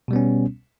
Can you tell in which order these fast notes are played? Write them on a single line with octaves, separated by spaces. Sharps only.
B2 G3 B3 C#4